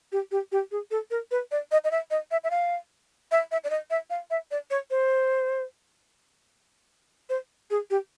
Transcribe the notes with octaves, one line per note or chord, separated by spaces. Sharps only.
G4
G4
G4
G#4
A4
A#4
B4
D5
D#5
D#5
E5
D#5
E5
E5
F5
E5
E5
D5
D#5
E5
F5
E5
D5
C#5
C5
C5
G#4
G4